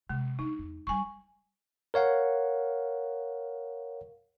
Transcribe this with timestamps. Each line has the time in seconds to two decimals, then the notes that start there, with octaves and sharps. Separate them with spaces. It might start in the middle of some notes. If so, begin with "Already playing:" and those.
0.09 C3 G#3
0.39 D4 D#4
0.59 E2
0.87 D3 G3 G#5 C#6
1.94 A#4 C#5 F5 F#5